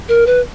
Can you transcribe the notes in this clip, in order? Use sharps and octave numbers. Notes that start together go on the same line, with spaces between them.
A#4
B4